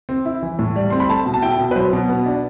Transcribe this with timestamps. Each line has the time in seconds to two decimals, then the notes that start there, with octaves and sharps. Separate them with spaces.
0.09 C4
0.25 E4
0.43 E3
0.59 A2
0.76 G3
0.90 C4 C6
1.00 B5
1.09 A3 A5
1.26 B2
1.34 A5
1.43 E4 G5
1.59 B2
1.71 B4
1.75 F#3 C5
1.93 B2
2.09 B3
2.26 D4